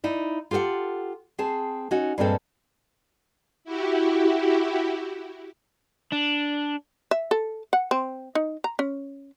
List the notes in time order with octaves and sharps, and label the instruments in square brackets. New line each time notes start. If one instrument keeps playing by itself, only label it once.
[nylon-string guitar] D#4 E4 D5
F4 G4 A4 D5 F#5
C4 G#4 A5
C#4 D#4 F#4
G2 A#2 G#3 C4 A4
[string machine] E4 F#4 G4
[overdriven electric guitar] D4
[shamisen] E5
A4
F#5
C4
D#4
A#5
C#4